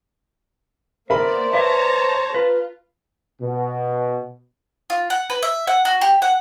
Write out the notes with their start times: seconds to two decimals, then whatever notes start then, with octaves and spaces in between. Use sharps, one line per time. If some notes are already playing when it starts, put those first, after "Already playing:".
1.10 A#3 B3 A#4 C5 D5 E5 B5
1.53 B4 C#5 D5 E5 A5 A#5
2.34 F4 B4
3.42 B2
4.90 F4
5.10 F#5
5.30 B4
5.43 E5
5.67 F#5
5.85 F#4
6.01 G4
6.22 F#5